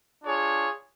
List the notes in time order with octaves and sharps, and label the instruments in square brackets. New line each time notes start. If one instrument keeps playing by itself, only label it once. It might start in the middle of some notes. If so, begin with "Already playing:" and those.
[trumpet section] D4 F4 G#4 C#5